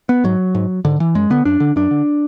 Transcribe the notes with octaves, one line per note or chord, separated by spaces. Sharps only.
B3
G#2 F#3
G#2
G#2 D3
E3
F#2 G#3
D3 B3
F#2 D4
D3
F#2 D4
D3